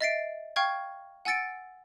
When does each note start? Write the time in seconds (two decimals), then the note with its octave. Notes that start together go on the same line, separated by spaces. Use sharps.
0.01 D#5 E5 A6 B6 C7 D7
0.56 F5 G5 C#6 F6 G#6
1.25 F#5 G#5 E6 A6 C#7 D7